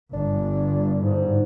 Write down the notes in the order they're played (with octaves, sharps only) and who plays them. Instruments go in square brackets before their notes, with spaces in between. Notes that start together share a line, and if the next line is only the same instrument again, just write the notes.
[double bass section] G1 [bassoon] D4
[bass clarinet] G#2